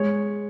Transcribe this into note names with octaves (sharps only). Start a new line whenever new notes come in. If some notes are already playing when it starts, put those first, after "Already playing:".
Already playing: G#3 C#5